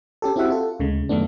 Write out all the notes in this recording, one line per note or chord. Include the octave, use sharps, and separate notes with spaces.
C#4 G4 A4
C4 E4 F#4 G4 E5 F#5
F4 A4
D2 C#3 G#3
F#2 D#3 A3 B3 D4